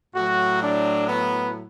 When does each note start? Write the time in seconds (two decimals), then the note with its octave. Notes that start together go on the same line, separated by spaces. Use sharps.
0.15 A2 F#3 F#4
0.61 D4
1.08 B3